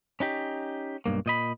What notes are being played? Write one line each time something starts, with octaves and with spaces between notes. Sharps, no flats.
C#4 D#4 G4
B1 G2 A#3
A#2 D#5 B5